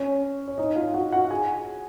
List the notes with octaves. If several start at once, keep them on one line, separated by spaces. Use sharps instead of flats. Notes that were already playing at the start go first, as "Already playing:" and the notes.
Already playing: C#4 C#5
C#5
D#4 D#5
F4 F5
F#4 F#5
F#4 F#5
G#4 G#5